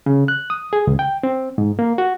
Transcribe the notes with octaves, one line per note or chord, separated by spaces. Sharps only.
C#3
F#6
D#6
G#4
C#2
G5
C4
G#2
A#3
F#4